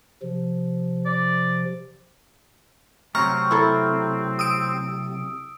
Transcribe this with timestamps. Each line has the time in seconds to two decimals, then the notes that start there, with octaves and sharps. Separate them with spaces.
0.23 C3 F3
1.05 D5
3.15 C3 F#3 A3 C4 A#5 C#6 F6
3.51 E4 A4
4.39 D#6 E6 D7